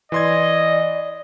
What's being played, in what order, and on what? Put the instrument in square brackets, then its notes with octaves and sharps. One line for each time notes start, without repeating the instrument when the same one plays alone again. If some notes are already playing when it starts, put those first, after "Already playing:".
[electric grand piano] E3 C6 G#6 [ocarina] D5 [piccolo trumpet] D#5